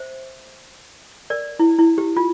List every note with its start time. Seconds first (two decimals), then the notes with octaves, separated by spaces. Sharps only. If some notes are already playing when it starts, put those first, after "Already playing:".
Already playing: C5 E5
1.30 A#4 D5
1.59 E4
1.78 E4
1.98 G4
2.17 F4